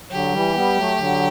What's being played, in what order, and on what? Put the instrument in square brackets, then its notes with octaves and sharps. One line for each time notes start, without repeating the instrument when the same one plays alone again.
[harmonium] D3 F#3 [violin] G4
[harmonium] E3 G3
G3 B3
F#3 A3
D3 F#3